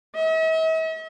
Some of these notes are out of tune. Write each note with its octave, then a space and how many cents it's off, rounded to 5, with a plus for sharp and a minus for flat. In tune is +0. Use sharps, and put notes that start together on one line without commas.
E5 -45